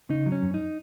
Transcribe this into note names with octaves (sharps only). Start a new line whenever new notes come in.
C#3 D#4
F#3
C#4
F#2
D#4